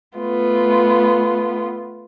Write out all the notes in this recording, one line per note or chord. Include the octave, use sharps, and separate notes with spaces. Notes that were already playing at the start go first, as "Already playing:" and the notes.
A3 B3 F4